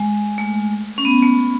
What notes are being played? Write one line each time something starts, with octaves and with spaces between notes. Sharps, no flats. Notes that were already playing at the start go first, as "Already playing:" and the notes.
Already playing: G#3
A3
C#4
B3
A3